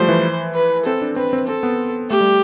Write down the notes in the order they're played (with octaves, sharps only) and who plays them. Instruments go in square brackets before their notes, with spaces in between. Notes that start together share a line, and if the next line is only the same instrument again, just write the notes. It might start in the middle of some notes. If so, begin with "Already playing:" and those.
Already playing: [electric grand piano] F3 G3 A3 [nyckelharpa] C5
[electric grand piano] E3
[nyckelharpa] B4
[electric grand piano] C4 [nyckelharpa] A4
[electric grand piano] D4
[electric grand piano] C4 [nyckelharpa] B4
[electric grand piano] C4
[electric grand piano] C4 [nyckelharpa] A4
[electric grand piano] B3
[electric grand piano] A3 [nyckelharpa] G4
[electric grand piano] G3